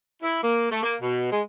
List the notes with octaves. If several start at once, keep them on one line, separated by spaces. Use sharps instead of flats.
E4
A#3
A3
A#3
B2
G#3